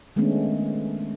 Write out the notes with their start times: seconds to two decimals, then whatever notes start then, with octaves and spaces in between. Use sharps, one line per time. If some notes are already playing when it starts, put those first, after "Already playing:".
0.16 D#3 G#3 A3 B3 C#4 D4